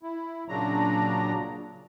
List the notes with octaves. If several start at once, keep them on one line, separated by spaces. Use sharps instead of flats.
E4
A#2 C#3 F#3 D4 A#5